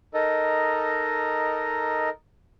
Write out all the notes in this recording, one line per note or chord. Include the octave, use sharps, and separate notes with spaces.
D#4 A4 A#4 D#5